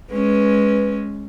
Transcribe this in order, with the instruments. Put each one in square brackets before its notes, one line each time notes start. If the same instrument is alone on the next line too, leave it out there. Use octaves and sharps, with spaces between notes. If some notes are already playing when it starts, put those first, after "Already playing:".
[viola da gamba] G#3 C#4 [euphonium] B4